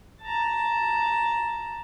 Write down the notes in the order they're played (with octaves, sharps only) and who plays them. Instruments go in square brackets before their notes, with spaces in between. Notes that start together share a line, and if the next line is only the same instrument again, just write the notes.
[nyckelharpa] A5 A#5